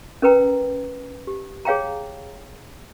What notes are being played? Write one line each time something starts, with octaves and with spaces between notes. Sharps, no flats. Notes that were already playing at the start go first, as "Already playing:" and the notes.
C#4 A#4 B4 G5 A#5
G4
G#4 C#5 F5 G5 A#5